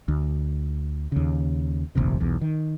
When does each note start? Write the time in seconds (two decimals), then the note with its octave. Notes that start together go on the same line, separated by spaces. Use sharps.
0.08 D2
1.12 D#2 C#3
1.95 F1 A#1 D#2 C3
2.21 B1 E2
2.41 D#3